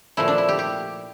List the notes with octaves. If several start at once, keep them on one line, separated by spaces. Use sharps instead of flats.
A#2 F3 A3 E4
D4
E4
G4
G4